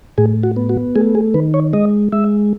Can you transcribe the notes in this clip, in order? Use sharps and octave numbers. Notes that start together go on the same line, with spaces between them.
A2 G#4
F#4
B3
F#4
A3 G#4
G#4
D#3 B4
C#5
G#3 D#5
G#3 E5